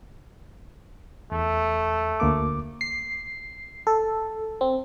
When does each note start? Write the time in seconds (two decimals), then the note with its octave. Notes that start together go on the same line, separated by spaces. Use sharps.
1.32 E2 A3
2.20 D2 A#3 D6
2.81 C7
3.87 A4
4.61 C4